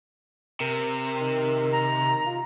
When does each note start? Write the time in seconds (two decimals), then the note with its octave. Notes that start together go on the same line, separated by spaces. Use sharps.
0.60 C3 A#4
1.21 D#3
1.72 A#5
2.26 F4